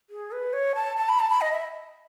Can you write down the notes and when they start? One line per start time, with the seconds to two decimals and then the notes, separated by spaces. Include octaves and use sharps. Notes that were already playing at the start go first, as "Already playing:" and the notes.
0.10 G#4
0.32 B4
0.53 C#5
0.75 A5
0.97 A5
1.09 B5
1.20 A5
1.30 B5
1.41 D#5
1.52 E5